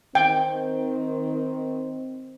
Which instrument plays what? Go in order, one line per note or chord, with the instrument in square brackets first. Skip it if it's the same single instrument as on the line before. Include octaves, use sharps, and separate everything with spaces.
[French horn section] D#3 C4 [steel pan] G5